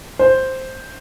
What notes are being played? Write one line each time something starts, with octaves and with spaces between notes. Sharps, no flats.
C5